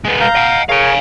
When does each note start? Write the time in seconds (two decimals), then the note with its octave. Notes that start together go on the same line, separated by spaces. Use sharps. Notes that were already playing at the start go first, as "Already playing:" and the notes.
0.05 G#3 B3
0.20 F5 A#5 G6
0.35 D#5 F#5
0.69 G#4 A#4 C#5 F5 G#5